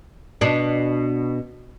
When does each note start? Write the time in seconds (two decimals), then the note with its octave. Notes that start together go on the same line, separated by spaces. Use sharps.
0.41 B2 D4